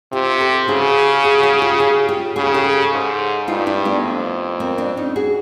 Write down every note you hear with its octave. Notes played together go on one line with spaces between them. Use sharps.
C3 F4 G4
G4 A4
C#3 F#4 G#4
F#4 G#4
F#4 G#4
F4 G4
F#4 G#4
F4 G4
C#3 F#4 G#4
G4 A4
G4 A4
G#2
G2 D#4 F4
D4 E4
A3 B3
F2
A#3 C4
C4 D4
C#4 D#4
F#4 G#4